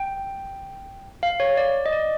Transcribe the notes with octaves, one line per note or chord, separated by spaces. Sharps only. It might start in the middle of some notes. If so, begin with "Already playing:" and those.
Already playing: G5
F5
C#5
D5
D#5
D5